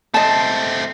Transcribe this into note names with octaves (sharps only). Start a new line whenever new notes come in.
A3 C4 D#5 A5